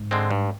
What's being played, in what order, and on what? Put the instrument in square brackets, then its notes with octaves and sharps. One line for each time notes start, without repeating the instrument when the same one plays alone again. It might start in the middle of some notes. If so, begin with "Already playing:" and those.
Already playing: [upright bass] G#2
[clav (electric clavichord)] D3 G#3 C4
G2